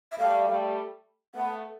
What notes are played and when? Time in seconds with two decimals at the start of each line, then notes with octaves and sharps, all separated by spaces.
0.12 E5
0.19 G3 A3 F5
0.48 G3 A3
1.35 A3 B3 F#5